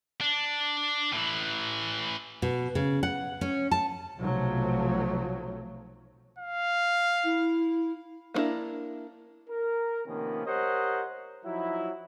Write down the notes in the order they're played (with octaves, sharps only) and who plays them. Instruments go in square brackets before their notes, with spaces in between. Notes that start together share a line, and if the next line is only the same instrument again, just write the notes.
[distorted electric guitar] D4
A2 E3
[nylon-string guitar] B2
C#3
F#5
C#4
A5
[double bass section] B1 C3 F3 F#3 A3
[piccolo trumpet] F5
[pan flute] E4
[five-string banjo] A#3 B3 D4 E4 A#4
[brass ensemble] A#4
C3 D#3 F3 A#3 B3 C#4
G4 A#4 C5 C#5 D#5 F#5
F3 F#3 D#4 E4